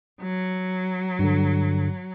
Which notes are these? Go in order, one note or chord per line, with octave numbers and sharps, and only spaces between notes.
F#3
G2 D3